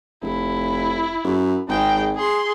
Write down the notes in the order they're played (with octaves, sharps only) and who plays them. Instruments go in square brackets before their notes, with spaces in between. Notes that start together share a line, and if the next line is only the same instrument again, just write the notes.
[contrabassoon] F1 [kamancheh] E4
[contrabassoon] F#2
[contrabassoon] G#1 [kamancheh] G#3 G5
[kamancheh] G#4 C6